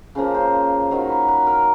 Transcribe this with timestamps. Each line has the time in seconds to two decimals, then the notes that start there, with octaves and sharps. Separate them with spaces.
0.15 C#3 F3 A#3 C5
0.34 C5
0.91 D#3 F#3 A#3 C5
1.09 B4
1.28 B4
1.47 A#4